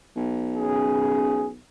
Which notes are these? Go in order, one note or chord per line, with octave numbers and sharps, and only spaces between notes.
B1
C#4 G#4